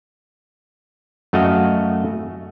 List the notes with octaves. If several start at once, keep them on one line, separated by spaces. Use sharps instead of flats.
F#2 A3 F#4 D#5 F5